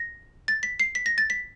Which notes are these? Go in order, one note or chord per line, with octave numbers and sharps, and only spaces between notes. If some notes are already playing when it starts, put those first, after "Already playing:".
Already playing: A#6
A6
B6
C7
B6
A#6
A6
B6